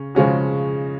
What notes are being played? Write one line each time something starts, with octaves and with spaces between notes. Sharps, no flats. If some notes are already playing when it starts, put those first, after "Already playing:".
Already playing: C#3 C#4
C#3 F3 G#3 C#4 F#4